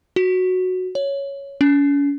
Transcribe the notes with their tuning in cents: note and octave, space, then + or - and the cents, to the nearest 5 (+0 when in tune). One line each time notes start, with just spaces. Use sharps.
F#4 -5
C#5 +5
C#4 +40